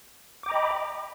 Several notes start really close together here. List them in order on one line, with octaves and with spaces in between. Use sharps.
D6 G5 A#5 D#5 B5